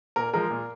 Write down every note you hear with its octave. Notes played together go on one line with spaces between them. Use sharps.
A#2 A#4
F3 G#3 A#4
A#2